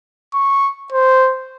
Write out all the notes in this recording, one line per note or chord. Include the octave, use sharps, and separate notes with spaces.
C#6
C5